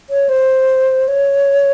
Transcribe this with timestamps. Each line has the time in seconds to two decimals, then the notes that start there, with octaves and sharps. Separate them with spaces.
0.10 C#5
0.29 C5
1.08 C#5